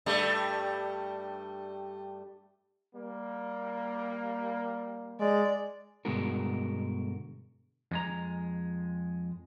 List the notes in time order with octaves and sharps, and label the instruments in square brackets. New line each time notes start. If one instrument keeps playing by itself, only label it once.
[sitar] G2 G3 A3
[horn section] G3 A#3
[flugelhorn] G#3 [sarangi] D5
[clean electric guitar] G2 B2 D3 G#3 F#4 A#4
F2 G#3 A#5